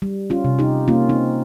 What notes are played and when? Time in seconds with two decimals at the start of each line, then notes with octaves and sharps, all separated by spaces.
0.02 G3
0.30 C#4 F4
0.45 C3
0.59 D#4 G4
0.88 A#3 C#4 F4
1.09 C4 D#4